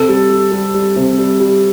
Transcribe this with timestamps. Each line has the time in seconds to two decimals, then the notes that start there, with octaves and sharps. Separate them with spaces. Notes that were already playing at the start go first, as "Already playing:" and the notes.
Already playing: C3 A4
0.09 G3
0.30 G3
0.52 G3
0.74 G3
0.96 C3
1.19 G3
1.40 G3